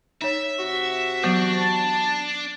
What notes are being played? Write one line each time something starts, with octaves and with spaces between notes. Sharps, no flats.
D#4 C#5 E5
C3 F#4
E3 F#3 B3 D4
A5